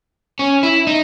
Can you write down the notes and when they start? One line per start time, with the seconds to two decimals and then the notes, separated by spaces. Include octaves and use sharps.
0.39 C#4
0.63 E4
0.87 D#4